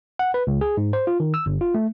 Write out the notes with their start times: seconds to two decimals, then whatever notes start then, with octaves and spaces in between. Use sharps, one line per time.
0.19 F#5
0.34 B4
0.47 C#2
0.61 G#4
0.77 G#2
0.93 C5
1.07 F4
1.20 D#3
1.34 E6
1.46 G1
1.61 F4
1.74 A3